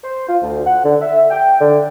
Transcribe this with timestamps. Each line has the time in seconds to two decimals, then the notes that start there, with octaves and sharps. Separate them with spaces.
0.04 C5
0.29 F4
0.42 D2
0.66 F#5
0.85 D3
1.02 E5
1.31 G5
1.61 D3